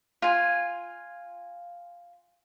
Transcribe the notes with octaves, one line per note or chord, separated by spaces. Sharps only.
F4 G#5